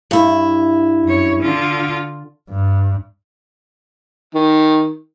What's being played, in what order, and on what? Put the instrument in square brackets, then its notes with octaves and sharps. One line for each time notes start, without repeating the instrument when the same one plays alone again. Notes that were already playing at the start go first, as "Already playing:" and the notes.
[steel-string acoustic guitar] G2 E4
[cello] F#2 C#5
D3 F4
[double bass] G2
[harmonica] D#3